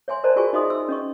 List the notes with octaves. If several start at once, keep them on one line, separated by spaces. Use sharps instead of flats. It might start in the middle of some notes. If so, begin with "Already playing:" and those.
C#5 E5 G#5 C6
A#4 C5 D5 D#5 A5 A#5
F4 F#4 G#4 A#4 G#5 C#6
D#4 F#4 D#5 E5 C6 D#6
E6
C#4 D#5 C#6